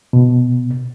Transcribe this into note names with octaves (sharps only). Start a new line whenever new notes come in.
B2